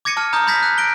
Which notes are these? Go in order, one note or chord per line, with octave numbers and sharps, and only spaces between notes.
D6 G#6 A#6 C#7 D#7
A5 D6 F6
A#5 D#6 G6
B5 G6 G#6 A#6 B6
F#6
A#6 D7 G7